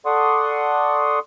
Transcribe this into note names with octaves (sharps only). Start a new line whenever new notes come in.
A4 D5 F#5 C6 C#6 D#6